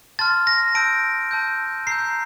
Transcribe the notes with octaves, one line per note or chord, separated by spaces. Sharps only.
A5 C6 F6 A6
A#6
A5 E6 G6 D7
A5 E6 G6
A#5 E6 G6 C7